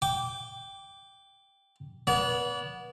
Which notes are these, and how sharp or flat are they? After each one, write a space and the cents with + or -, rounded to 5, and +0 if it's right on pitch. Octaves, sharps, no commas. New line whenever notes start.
G5 +0 D6 -15
B3 -20 D5 -40